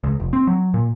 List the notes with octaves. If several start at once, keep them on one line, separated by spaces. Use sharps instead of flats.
C#2
F1
C4
F#3
A#2